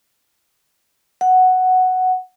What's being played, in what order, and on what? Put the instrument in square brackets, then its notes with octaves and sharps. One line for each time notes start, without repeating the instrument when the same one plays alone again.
[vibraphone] F#5